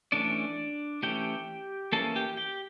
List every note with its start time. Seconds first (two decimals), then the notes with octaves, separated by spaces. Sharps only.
0.12 E3 A3 C#4 D4 D5
1.03 E3 A3 C#4 G4 G5
1.92 E3 A#3 C#4 A4 A5
2.16 G4 G5
2.37 G4 G5